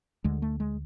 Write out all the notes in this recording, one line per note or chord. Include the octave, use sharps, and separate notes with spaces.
D2 D3 G#3
A3
G#3